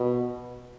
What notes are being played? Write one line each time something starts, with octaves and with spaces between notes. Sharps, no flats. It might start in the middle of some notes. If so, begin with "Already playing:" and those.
Already playing: B2